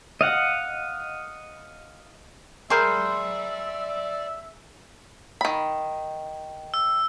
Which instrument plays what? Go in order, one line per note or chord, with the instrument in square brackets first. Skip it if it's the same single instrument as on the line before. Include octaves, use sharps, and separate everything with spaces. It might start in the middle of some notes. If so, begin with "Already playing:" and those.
[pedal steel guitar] D#5 F5 F#5
[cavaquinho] G#4 A#4 [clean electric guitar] C5 [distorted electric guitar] D5 B5 [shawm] E5
[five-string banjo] D#3 B5
[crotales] E6